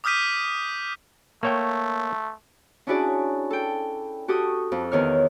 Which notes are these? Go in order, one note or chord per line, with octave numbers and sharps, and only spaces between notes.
D6 D#6 F6 G6 B6 D#7
A3 A#3 C#5 G5
C#4 D4 E4 F#4 G#4 D5
A4 G5
F#4 G4 A4 C#6 D#6
F2
E2 D#3 C#5 F6